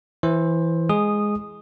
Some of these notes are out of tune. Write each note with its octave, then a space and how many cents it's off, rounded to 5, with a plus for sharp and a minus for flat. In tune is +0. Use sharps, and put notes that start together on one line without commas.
E3 +0 E4 +0 C5 +15
G#3 +0 G#4 +0 D#6 -10